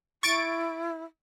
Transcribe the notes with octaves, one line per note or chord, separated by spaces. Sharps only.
E4 C#6 A6 D7